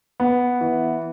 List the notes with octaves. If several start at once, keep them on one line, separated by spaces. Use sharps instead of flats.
B3
E3